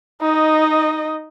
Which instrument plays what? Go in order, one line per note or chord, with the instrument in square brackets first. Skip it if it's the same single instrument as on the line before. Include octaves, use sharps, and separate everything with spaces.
[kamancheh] D#4 D#5